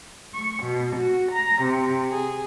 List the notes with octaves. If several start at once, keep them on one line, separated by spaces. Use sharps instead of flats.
C#6
B2
F#4
A#5
C3
G#4